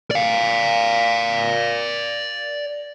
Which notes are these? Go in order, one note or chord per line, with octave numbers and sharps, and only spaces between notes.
D5 F5